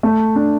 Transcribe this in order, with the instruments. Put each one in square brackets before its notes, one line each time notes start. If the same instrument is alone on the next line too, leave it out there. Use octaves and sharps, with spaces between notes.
[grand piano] A3
D4